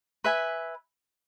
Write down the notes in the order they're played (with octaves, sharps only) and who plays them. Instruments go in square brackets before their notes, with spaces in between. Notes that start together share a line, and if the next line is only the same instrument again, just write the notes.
[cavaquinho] B4 E5 G#5